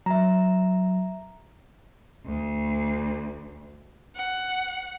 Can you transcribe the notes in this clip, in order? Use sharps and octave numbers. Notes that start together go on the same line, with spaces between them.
F#3 E5 A#5
D2
F#5